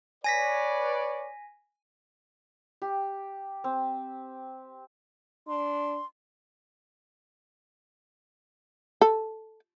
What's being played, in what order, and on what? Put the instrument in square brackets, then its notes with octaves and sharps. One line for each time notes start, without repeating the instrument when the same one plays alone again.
[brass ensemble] B4 C#5 D5 [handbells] G#5 A#6 B6
[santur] G4
C4
[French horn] D4 [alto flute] C6
[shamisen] A4